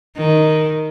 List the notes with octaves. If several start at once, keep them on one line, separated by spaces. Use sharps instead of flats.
D#3